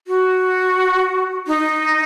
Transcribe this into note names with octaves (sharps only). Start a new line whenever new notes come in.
F#4
D#4